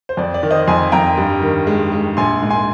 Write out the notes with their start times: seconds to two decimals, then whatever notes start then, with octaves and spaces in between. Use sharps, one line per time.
0.09 C5
0.17 F2 D5
0.34 D5
0.43 D#3
0.51 C5 D#5
0.67 F2 G#5 C6
0.92 F2 G5 A#5
1.17 G2
1.42 D#3
1.67 G#3
1.92 G#3
2.17 A#1 G#5 C6
2.42 G#2
2.50 G#5 C6